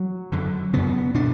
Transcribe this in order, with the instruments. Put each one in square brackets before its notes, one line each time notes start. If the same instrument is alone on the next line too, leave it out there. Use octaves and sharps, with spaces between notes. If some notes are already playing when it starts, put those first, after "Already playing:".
Already playing: [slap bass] F#3
F#2 D3
F#2 C#3 B3
B2 D4